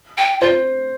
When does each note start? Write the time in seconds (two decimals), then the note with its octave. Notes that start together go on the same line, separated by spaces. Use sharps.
0.18 G5
0.41 F4 C5